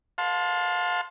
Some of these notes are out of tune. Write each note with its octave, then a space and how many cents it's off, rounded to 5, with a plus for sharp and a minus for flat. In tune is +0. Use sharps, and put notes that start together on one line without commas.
F5 +35 A5 +0 C6 +0